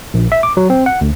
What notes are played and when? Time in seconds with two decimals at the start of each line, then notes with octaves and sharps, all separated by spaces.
0.14 A#1
0.32 E5
0.43 D6
0.57 F#3
0.70 C4
0.86 F#5
1.01 D2